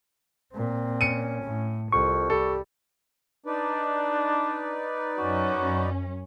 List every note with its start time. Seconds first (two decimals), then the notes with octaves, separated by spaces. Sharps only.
0.54 A#2 C4
1.01 C#4 C#7 D#7
1.44 A2
1.92 C2 F2 C#6
2.30 G3 A4
3.46 D4 D#4 B4 D5
5.18 F#2 C#4 F#4